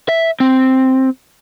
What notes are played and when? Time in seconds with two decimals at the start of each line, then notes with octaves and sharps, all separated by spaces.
0.09 E5
0.40 C4